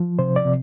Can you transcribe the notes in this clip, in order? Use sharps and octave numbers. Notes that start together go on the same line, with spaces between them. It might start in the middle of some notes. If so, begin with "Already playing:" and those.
Already playing: F3
C3 C5
D5
C3